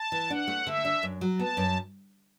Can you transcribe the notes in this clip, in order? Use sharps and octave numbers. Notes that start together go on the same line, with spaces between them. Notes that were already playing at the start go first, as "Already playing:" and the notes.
Already playing: A5
E3
D4 F#5
A3
D3 E5
D4
F#2
F#3
B3 A5
F#2